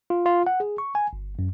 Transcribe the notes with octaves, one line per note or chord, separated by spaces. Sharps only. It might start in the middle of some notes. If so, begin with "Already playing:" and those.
F4
F4
F#5
G#4
C#6
G#5
G1
F#2